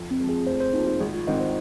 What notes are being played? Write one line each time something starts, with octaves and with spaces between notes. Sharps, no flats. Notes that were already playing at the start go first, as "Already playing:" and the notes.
Already playing: F2
C4
F3 G#3
G#4
F1 C5
C5
F2 F3 A#3 D#4
F4
G#1 G#4
F4
G#2 D#3 C4 D#5
C5